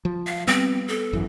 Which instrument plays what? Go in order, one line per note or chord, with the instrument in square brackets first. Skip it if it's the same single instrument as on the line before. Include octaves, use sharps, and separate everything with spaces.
[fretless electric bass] F3
[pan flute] F5
[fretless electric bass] G3 B3 [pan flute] C4
[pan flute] A4
[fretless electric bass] G#1 F#2 E3